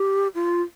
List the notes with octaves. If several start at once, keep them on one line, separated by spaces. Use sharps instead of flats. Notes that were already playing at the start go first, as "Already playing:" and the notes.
Already playing: G4
F4